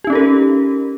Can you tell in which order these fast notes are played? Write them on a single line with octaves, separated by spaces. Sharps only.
G4 D#4 C#4 A4 A#4